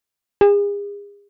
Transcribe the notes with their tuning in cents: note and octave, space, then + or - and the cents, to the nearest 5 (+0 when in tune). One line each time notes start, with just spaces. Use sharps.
G#4 -40